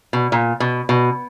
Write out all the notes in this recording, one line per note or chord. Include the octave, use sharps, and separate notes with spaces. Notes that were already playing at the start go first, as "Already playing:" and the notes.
B2
A#2
B2
B2